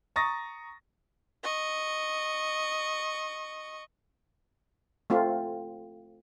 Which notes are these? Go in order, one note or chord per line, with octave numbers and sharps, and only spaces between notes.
A#5 C#6 D#6 A6 A#6
D#5 C#6
A3 C4 F4